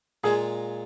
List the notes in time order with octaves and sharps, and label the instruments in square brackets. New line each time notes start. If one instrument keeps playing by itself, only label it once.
[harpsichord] A#2 G#3 F4 [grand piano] G#4